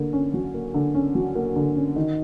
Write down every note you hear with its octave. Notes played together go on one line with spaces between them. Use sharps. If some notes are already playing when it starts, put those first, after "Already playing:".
Already playing: D3 A#3
C#4
F#3
A#3
D3
C#4
F#3
A#3
D3
C#4
D#3